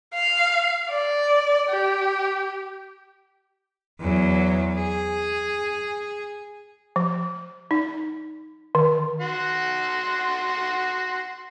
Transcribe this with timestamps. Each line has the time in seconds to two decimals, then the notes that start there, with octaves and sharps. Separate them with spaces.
0.14 F5
0.90 D5
1.70 G4
4.01 E2 F#3
4.75 G#4
6.96 F3
7.71 D#4
8.75 D#3
9.20 F#4 F#5 C6